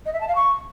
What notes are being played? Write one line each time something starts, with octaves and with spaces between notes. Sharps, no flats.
D#5
E5
A5
F5
C#6